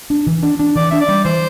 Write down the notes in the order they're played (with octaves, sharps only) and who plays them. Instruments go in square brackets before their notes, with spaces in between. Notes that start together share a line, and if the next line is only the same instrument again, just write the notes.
[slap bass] D4
E3
D4
D4
[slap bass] E3 [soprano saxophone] D5
[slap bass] D4 [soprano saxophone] E5
[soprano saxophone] D5
[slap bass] G3
[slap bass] E3 [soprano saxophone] C5